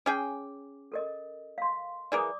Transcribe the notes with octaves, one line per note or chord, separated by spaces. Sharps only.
C#4 G#4 G5 D6
A4 A#4 D#5
F5 C6
E3 G#4 A#4 D5 D6 D#6